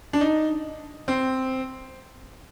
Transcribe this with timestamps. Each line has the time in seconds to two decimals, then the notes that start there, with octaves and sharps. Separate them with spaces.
0.13 D4
0.21 D#4
1.08 C4